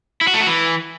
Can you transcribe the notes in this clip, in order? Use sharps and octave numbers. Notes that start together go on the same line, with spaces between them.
E4
F#4
A3
F#4
E3